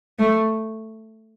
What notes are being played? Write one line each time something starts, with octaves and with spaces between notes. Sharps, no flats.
A3